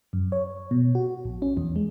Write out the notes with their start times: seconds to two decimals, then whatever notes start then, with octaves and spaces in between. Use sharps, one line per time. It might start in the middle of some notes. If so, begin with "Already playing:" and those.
0.13 F#2
0.32 C#5
0.71 B2
0.95 F#4
1.25 A#1
1.42 C#4
1.57 E2
1.76 G#3